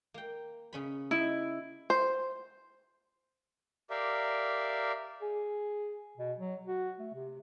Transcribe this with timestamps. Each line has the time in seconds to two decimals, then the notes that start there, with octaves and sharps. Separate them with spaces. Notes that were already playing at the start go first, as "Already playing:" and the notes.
0.14 A#3 G5
0.73 C#3 C#4 B5
1.11 E4 D#5
1.90 C5
3.90 G4 A#4 D5 E5 F5
5.22 G#4
6.18 B2
6.38 F#3
6.67 F#4
6.99 A3
7.14 C3